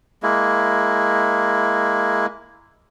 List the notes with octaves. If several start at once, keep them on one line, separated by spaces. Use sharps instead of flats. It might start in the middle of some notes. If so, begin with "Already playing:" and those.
G#3 A#3 E4